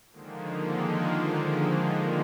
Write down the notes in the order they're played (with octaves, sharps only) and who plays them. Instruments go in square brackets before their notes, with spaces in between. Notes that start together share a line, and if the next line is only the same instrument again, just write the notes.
[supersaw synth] D3 D#3 F3 G#3 A#3